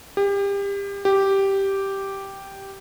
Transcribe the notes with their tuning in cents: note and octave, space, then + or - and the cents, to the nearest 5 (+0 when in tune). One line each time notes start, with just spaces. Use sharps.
G4 +30
G4 -5